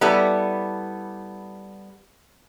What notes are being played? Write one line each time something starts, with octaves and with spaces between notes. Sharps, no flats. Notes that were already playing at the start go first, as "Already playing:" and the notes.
G3 B3 E4 A4